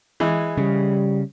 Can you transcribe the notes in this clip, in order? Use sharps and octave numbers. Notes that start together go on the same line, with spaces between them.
E3 G#3
C#3 G3